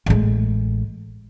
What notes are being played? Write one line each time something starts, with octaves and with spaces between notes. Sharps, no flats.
A1 G#3